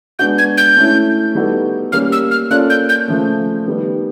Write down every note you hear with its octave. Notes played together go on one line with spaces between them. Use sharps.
G#3 B3 D4 F#4 G6
G#6
G6
A3 C#4 E4
G3 B3 D#4 F#4 A4
G3 A#3 C#4 F6
E6
F6
A#3 C#4 F4 A4 D5 F#6
G6
G6
C#3 F3 A3
D#3 G3 B3